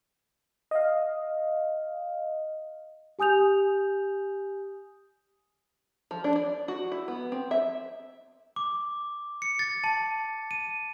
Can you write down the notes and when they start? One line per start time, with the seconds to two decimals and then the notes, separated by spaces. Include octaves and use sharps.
0.71 D#5 F5
3.19 G4 G#5 D#6 G6 F7
6.11 F3
6.24 D4
6.36 D5
6.68 F#4
6.92 E4
7.08 B3
7.32 C4
7.51 E5
8.56 D6
9.42 C#7
9.59 A6
9.84 A5
10.51 D#7